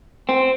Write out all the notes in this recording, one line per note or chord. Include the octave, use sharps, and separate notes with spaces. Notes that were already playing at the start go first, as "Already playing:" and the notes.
C4